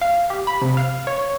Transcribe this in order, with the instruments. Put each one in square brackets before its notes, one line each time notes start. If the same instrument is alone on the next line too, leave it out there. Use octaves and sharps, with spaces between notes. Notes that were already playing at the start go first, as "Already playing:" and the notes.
[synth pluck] F5
G4
B5
C3
F5
C#5